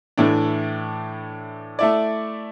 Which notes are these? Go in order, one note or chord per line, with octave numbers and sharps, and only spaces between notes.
A2 E3 A3 D4
A3 E4 D5